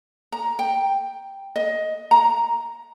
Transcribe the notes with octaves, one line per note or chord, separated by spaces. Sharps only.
A#5
G5
D#5
A#5